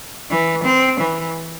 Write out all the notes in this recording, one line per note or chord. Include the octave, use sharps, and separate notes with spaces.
E3
C4
E3